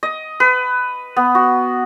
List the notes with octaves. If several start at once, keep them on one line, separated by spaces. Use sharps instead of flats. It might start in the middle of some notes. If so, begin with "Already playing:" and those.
D#5
B4
B3
F#4